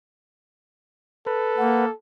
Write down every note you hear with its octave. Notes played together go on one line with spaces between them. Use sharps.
A4 B4
A#3 F#5